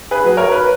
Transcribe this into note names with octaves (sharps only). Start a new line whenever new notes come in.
G#4 B4
F#3
A#4 C#5
B4